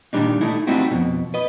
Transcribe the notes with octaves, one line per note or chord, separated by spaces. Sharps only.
A#2 D#3 F3 G3 D4 D#4
A3 D#4 E4
G3 A3 C4 D#4 E4 F#4
F2 B2
B4 D#5